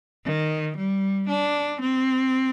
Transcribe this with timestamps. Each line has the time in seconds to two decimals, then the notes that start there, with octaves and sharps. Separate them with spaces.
0.25 D#3
0.77 G3
1.29 D4
1.81 C4